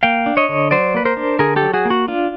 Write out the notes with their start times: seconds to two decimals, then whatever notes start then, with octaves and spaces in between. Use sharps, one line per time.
0.03 A#3 F5 G5
0.26 D4
0.37 C#5 D#5
0.49 D3
0.71 F#3 C5 D5
0.94 A#3 B4
1.05 A#4 C5
1.17 D4
1.39 D3 G#4 A#4
1.56 G4 A4
1.62 F#3
1.74 F#4 G#4
1.85 A#3
1.90 F#4
2.08 D4 F4